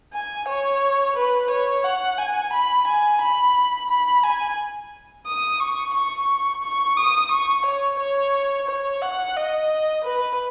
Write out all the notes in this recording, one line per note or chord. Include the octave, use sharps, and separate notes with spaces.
G#5
C#5
B4
C#5
F#5
G#5
B5
G#5
B5
B5
G#5
D#6
C#6
C#6
C#6
D#6
C#6
C#5
C#5
C#5
F#5
D#5
B4